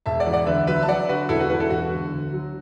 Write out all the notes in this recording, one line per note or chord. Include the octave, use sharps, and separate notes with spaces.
E1 E5 A5
D5 F#5
E3
D5 F#5
D2 B4 E5
F#3 B4 E5
A5
F#3 D5 F#5
D3 F#4 B4
E1 E4 A4
F#4 B4
E3 F#4 B4
E4 A4
E1 F#4
D3
D2
F#3